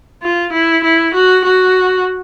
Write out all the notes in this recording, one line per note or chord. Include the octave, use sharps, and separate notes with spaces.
F4
E4
E4
F#4
F#4